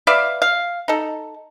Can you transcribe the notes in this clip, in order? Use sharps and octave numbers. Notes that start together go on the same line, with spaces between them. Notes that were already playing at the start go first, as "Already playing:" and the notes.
B4 D5 E5 F5
F5
D#4 A4